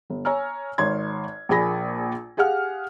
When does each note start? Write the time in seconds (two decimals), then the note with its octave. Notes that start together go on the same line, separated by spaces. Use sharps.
0.10 G1
0.25 C#5 G#5 A#5 E6 F6
0.78 G#1 C#5 C6 G#6
1.49 A#1 A#2 G#4 G#5 B5 A#6
2.37 G4 G#4 F5 F#5 F6